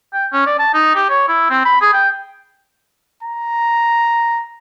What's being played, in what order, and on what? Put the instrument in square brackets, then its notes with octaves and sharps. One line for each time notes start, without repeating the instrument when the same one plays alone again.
[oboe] G5
C#4
D5
A5
D#4
G4
C#5
E4
C4
B5
G#4
G5
[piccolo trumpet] A#5